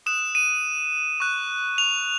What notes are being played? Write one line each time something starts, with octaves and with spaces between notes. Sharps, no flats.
D#6 F#6 E7
D#7
C#6 F#6
F7